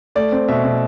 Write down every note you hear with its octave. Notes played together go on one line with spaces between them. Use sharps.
A3 D5
C4
B2 E5
B2